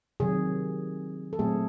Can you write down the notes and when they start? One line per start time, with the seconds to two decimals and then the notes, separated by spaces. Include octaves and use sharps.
0.20 C3 D#3 F#3 G#4
1.33 A4
1.39 A#2 F#3 A3 C4 G#4